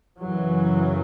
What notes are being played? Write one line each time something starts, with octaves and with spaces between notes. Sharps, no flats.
F#2 C#3 E3 F#3